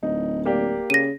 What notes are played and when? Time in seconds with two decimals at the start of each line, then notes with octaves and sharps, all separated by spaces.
0.03 D1 D#4
0.45 A#3 G4 D5
0.90 C#3 A#6 D#7